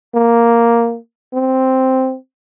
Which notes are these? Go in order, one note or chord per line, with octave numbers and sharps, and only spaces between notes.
A#3
C4